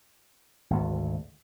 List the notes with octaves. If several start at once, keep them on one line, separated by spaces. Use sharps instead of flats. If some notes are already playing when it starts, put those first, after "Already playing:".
G#1 D2